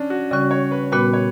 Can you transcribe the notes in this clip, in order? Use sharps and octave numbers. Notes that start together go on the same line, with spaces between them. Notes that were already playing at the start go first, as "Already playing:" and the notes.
Already playing: C#4 D4
F#4
C#3 G3 C#4 F#4 D5
C#5
B4
A#2 G3 B3 F#4 B4
C#5